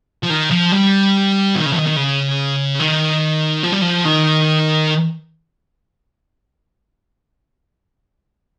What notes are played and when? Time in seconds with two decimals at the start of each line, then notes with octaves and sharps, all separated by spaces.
0.23 F3
0.30 D#3
0.51 F3
0.72 G3
1.55 D#3
1.66 C#3
1.72 F3
1.76 D#3
1.87 D#3
1.96 C#3
2.80 D#3
3.63 F3
3.72 G3
3.82 F3
4.05 D#3